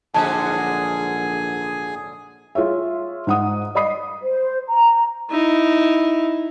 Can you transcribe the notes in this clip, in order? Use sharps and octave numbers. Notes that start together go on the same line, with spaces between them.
A#1 G#2 D3 F#3 G#4 G#5 A5
F4 G#4 C#5 E5
G#2 F#5 D#6
D5 D#5 B5 D#6 C7
C5
A#5
D#4 E4